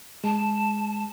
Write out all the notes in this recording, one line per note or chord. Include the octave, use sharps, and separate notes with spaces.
G#3 A5